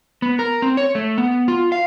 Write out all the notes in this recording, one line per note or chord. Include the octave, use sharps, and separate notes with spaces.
B3
A#4
C4
C#5
A3
B3
F4
F5